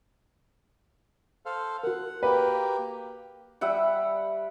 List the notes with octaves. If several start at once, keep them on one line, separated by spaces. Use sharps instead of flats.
A4 C5 F5
F#4 A#4 F#5
A#3 G4 B4
G3 E5 F#5